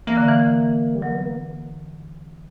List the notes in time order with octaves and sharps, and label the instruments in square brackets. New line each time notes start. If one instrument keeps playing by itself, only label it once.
[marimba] E3 [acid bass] A#3
[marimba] D3
E3
[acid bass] G3
[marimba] F#3 [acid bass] A#3
[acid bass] B3
A#3